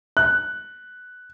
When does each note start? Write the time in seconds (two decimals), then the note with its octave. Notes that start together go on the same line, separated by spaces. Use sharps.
0.17 F#6